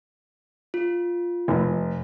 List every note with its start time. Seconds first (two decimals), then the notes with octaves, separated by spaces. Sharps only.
0.74 F4
1.48 F1